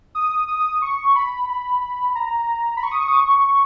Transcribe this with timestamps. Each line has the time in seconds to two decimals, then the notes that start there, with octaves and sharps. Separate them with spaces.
0.15 D#6
0.48 D#6
0.82 C#6
1.15 B5
1.49 B5
2.15 A#5
2.77 B5
2.83 C#6
2.91 D#6
3.00 C#6
3.08 D#6
3.17 C#6